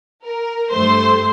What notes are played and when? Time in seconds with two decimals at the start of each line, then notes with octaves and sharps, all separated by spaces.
0.22 A#4
0.70 G2 A3 C5 C6